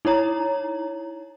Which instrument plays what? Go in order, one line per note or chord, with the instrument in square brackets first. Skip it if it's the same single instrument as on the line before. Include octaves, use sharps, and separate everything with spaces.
[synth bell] D#4 E4 C#5 A#5